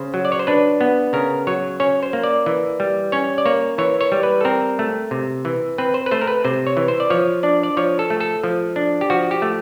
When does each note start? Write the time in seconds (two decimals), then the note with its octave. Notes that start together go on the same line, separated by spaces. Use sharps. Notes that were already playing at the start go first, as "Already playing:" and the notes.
Already playing: C#3 C5
0.14 F#3
0.25 D5
0.32 C#5
0.39 C5
0.47 D4 B4
0.81 B3
1.13 C#3 A#4
1.47 F#3 C#5
1.80 C#4 C#5
2.03 C5
2.13 A#3
2.24 D5
2.46 E3
2.80 G3
3.12 C#4 C#5
3.38 D5
3.45 A#3 C#5
3.78 E3 C#5
4.01 C#5
4.12 G3
4.23 B4
4.41 A4
4.45 C4 A#4
4.79 A3
5.11 C3
5.45 E3
5.78 C4 B4
5.94 C5
6.06 B4
6.11 A3 C5
6.22 A#4
6.27 B4
6.44 C3 C5
6.66 C#5
6.77 E3
6.88 C5
7.00 D5
7.10 F3 C#5
7.43 D4 D5
7.63 D5
7.77 F3 C#5
7.99 A4
8.10 A3
8.20 A4
8.44 F3
8.76 D4
9.01 G4
9.10 F3 F#4
9.31 G4
9.42 A3